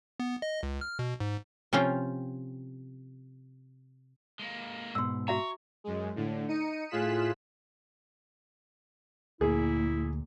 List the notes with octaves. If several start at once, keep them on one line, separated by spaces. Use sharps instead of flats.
B3
D#5
C#2
F6
B2
G#2
C3 F3 C#4 F4 G5
G#3 A#3
G#2 B2 C6 E6
F#4 C#5 E5 A#5
F#2 G#3
A2 D3
D#4 C#7 D#7
A2 F4 G#4 F#6 B6 E7
D2 A#2 E4 G#4